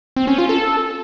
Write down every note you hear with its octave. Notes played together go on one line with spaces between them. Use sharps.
C4
C#4
F4
A4